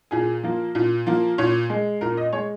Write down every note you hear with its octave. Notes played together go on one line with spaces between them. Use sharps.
A#2 G#4
F3 A#3
A#2
F3 A#3
A#2 C#5
G#3
A#2 A#4
D#5
G#3 C#5